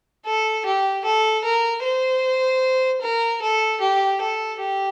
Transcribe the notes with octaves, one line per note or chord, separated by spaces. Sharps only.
A4
G4
A4
A#4
C5
A#4
A4
G4
A4
G4